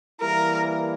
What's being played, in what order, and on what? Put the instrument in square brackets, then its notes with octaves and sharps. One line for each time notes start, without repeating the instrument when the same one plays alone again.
[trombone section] E3 G3 A#3 E4 [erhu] A#4